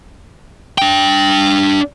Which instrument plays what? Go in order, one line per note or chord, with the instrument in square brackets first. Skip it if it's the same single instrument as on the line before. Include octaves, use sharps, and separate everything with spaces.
[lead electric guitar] D4 G5